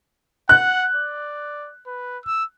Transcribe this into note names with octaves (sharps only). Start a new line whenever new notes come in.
F#5 F#6
D5
B4
E6